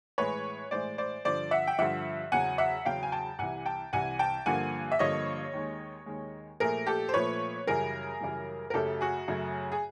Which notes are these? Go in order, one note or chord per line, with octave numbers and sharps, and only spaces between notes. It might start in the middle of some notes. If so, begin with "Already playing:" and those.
A2 E3 G#3 B4 C#5
A2 E3 G#3 C5 D5
C5 D5
G2 D3 F3 C5 D5
E5 F#5
G5
G2 D3 F3 E5 F#5
E2 C#3 F#3 F#5 G#5
E5 F#5
E2 C#3 F#3 F5 G5
G#5
G5 A5
C2 C3 E3 F#5 G#5
G5 A5
C2 C3 E3 F#5 G#5
G5 A5
G2 D3 F3 A#3 F#5 G#5
E5
G2 D3 F3 A#3 C#5 D#5
D#2 D#3 G#3
D#2 D#3 G#3
A#2 F3 A3 G#4 A#4
G4 A4
C5
A#2 F3 A3 B4 C#5
F#2 C#3 E3 G3 G#4 A#4
F#2 C#3 E3 G3
A#4
F#2 C#3 F#3 A3 G4 A4
F#4 G#4
F#2 C#3 F#3 A3
G#4